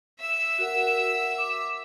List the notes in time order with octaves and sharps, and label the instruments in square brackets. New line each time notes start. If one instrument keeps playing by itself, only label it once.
[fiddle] E5 E6
[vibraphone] F#4 A#4 F#5
D6